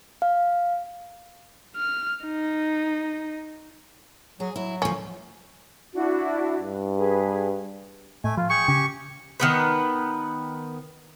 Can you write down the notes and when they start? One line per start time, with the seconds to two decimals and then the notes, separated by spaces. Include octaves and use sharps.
0.22 F5
1.76 F6
2.25 D#4
4.40 F#3 G#4
4.56 F#3 E4
4.82 D2 F3 C#4
5.94 D4 E4 F#4
6.60 G2
6.97 G#4 B4
8.24 A2 A3 G#5
8.37 F3 F4
8.50 G#4 G5 C#6 C#7
8.68 C#3 G4 G#5
9.40 D#3 B3 B4